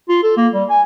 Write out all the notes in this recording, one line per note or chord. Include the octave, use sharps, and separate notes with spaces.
F4
A4
A#3
G3
G#5